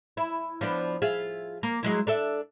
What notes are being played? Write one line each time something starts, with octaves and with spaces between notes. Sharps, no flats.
E4
F3 B3 D4
F4 G#4 E5
A#3
F#3 G#3 E4
D4 A4 E5